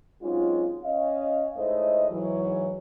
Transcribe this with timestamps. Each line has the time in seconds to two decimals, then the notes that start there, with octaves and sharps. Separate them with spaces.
0.22 F#3 G#3 C4 C#4 D#4 F4
0.83 C#4 D#5 F5
1.56 G#2 A3 E4 C5 C#5 D#5
2.10 G#2 E3 F#3